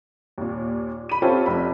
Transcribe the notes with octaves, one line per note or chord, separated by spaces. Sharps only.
D#2 A#2
B5 D#7
C4 C#4 F4 G4 A4
F1 B5